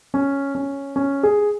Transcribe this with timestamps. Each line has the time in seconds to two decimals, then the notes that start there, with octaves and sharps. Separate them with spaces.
0.14 C#4
0.55 C#4
0.96 C#4
1.23 G#4